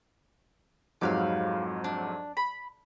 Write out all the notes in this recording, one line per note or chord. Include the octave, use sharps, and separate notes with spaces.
F2 G#2 F#3 G4 B4 F5
D4
B5